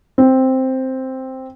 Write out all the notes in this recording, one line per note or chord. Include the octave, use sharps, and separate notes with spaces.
C4